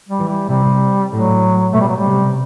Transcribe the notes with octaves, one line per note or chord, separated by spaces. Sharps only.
G3
E3
G3
C3 G3
A2 F#3
B2 A3
G3
F#3
G3
C3